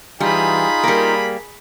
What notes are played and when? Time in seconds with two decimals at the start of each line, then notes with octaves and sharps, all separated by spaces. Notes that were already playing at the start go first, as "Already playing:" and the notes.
0.20 E3 G3 D#4 F4 G#4 B5
0.84 G3 A#3 A#4